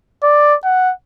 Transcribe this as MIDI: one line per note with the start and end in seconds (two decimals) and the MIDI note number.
0.23 0.55 74
0.64 0.93 78